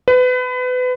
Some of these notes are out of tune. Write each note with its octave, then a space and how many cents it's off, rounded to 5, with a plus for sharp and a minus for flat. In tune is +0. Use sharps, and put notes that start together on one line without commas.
B4 +30